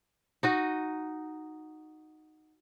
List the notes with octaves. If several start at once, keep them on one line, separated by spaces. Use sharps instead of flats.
D#4 F#4 D#5